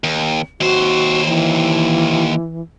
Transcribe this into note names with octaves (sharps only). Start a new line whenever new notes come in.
D#2
D#2 F#4 C5
E3